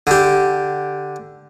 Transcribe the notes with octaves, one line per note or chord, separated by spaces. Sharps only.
D3 G4